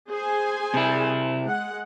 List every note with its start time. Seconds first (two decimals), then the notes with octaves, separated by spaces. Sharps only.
0.12 G#4 C5 G#5
0.74 C3 E4
1.47 G#3 F#5